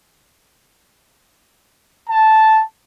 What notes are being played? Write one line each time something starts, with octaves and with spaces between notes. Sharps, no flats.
A5